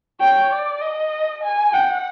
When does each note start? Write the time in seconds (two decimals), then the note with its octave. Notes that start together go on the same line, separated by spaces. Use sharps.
0.20 C#5 G5
0.51 D5
0.81 D#5
1.43 G#5
1.73 F#5 G5